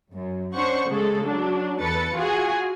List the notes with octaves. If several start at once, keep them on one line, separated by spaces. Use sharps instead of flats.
F#2
C#4 D4 C5 F#5 C#6
C#3 G#3 G#4 A4
F#3 D4
E2 A4 B4 A6 C#7
F4 F#4 G#4 F#5 G#5